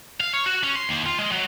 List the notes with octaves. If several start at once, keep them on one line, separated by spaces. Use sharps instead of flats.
F5
C#5
F#4
C#4
C6
D#2
F4
G#3
F#3